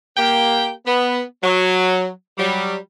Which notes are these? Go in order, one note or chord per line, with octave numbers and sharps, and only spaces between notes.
A#3 G4 G5
B3
F#3
F#3 G3